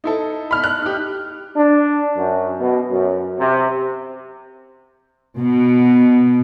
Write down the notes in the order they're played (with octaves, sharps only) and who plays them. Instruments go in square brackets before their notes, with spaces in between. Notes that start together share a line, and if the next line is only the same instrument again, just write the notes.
[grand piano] D#4 E4 A4
[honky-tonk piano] B5 F6
F#6
[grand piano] D#4 G4
[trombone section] D4
F#2
B2
F#2
C3
[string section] B2